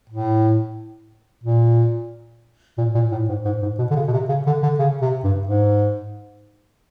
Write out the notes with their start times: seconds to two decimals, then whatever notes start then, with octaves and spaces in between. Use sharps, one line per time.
0.09 A2
1.43 A#2
2.78 A#2
2.94 A#2
3.11 A2
3.29 G#2
3.45 G#2
3.62 G#2
3.78 B2
3.90 D3
3.95 C#3
4.07 B2
4.13 C3
4.29 C#3
4.46 D3
4.63 D3
4.79 C#3
5.01 C3
5.24 G2
5.47 G#2